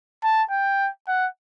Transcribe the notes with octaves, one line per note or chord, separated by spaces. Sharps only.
A5
G5
F#5